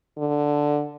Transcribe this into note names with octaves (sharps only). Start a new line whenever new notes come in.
D3